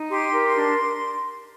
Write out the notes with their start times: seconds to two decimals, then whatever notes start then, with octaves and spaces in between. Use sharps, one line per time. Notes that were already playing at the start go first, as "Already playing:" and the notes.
Already playing: D#4
0.09 G4 C6
0.33 A#4
0.44 C6
0.56 D4